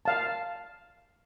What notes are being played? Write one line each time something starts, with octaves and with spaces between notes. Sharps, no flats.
F5 A5